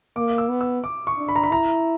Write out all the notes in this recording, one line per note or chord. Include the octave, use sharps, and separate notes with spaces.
A#3 D6
E6
B3
E6
D6
C#6
D4
B5
A#5
B5
E4 A#5